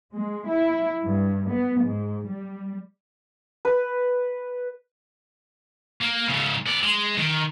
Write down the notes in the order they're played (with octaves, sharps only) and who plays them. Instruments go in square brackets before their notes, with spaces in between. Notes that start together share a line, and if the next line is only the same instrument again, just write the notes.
[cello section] G#3
E4
G2
B3
G#2
G3
[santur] B4
[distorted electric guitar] A#3
G#2 C#3
B3 D5
G#3
D#3